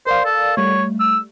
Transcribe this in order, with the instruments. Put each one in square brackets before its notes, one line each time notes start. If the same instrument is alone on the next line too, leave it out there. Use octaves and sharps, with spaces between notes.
[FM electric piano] A#4 D5 F5 [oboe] C5
[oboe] A4
[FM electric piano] G3 A3 [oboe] C#5
[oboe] E6